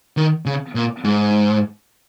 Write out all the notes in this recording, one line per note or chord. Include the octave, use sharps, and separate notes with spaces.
D#3
C#3
A#2
G#2